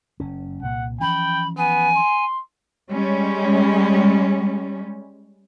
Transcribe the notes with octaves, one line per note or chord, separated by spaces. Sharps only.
F#1 C#4
C2 A#2 F#5
E3 F3 C#4 G5 B5
B3 G#5
C6
G3 G#3 C#4